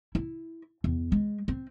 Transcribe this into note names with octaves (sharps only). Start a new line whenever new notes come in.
E4
E2
G#3
C4